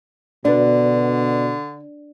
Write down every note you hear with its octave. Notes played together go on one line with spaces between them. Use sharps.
B2 D3 D4 B4 D5